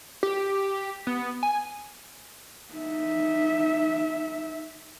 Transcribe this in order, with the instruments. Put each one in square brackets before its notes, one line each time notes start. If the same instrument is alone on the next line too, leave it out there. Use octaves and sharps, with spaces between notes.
[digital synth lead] G4
B3
G#5
[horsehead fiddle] D#4 E5